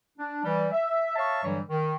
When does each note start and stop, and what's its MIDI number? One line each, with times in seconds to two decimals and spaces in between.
0.18 0.43 62
0.44 0.67 52
0.44 0.67 55
0.72 1.16 76
1.16 1.41 73
1.16 1.41 76
1.16 1.41 77
1.16 1.41 81
1.16 1.41 85
1.44 1.61 43
1.44 1.61 50
1.44 1.61 52
1.44 1.61 54
1.44 1.61 55
1.69 1.96 51